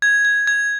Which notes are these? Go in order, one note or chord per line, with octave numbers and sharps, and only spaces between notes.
G#6
G#6
G#6